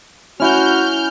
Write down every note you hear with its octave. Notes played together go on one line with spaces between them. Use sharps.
C#4 E4 F#4 F6 G6